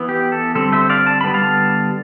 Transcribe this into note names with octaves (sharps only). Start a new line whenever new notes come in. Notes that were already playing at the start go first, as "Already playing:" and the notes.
Already playing: E3 B3
G4
A4
D3 G3 C4 A4
C5 E5
D5 F5
A5
D3 G3 B3 B5
F5 A5